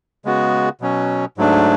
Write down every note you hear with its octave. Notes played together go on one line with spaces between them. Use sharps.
C#3 G#3 B3 F#4
B2 F#3 C#4
G#2 F#3 A3 D4